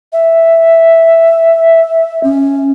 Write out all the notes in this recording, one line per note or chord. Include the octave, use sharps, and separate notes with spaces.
E5
C#4